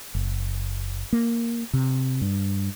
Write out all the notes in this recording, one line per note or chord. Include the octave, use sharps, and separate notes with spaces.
F#1
A#3
C3
G2